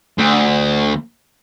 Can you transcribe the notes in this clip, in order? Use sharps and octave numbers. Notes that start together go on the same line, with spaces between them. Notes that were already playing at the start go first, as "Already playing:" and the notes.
D2